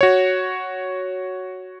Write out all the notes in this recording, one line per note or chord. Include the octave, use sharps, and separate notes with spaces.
F#4 C#5